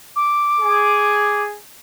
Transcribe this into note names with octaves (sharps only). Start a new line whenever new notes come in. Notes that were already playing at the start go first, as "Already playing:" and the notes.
D6
G#4